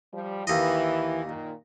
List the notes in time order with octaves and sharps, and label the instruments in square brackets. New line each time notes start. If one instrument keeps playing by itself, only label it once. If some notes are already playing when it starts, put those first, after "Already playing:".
[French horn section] F3 G3
[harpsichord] D#2 D#5 [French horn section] E3
[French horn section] A#2 D#3